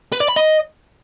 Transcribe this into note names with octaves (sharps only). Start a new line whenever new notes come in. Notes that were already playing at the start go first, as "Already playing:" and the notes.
B4
D5
B5
D#5